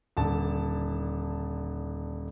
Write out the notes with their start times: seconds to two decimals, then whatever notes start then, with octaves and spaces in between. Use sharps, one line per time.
0.17 D#1 D3 A5